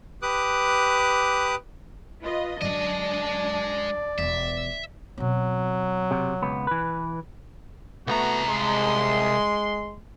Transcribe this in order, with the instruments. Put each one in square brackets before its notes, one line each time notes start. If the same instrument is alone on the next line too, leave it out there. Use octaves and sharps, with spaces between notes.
[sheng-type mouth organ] G4 B4 D6 D#6 F#6
[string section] F4 B4 D#5
[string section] F#2 D4 [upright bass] D3 F#3 [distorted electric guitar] G#3 D#5 [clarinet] D5
[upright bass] E1 F4 [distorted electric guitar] E5
[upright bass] B2 C4 [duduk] F#3
[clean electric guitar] C3
C#2 B3
E3 B4
[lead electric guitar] C2 A#5 [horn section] A3 B3 F#4
[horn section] G#3 C6